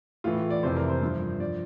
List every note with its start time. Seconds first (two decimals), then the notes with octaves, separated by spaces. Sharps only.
0.24 A2 E3 F4
0.51 D5
0.63 F2 C3 E3 C5
0.76 A#4
0.89 C5
1.02 G2 F3
1.40 F3 D5